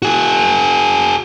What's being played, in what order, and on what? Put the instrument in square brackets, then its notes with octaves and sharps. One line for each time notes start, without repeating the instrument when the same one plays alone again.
[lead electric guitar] F#4 G#4